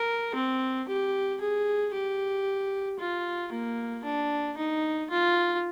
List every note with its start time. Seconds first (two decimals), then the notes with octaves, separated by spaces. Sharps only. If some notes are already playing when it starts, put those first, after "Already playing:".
Already playing: A#4
0.35 C4
0.88 G4
1.41 G#4
1.93 G4
2.99 F4
3.52 A#3
4.04 D4
4.57 D#4
5.10 F4